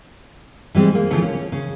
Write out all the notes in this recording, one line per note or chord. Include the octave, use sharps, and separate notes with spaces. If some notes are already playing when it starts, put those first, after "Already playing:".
E3 G3 G#3 C4
A#3
C#3 E3 F3 A3
C#4
C#4
C#3